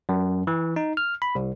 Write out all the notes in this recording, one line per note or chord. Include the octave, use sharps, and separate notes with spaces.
F#2
E3
D#4
F6
B5
C2